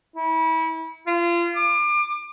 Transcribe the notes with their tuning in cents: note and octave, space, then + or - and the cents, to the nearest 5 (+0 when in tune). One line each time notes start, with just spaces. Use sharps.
E4 -30
F4 -30
D6 +30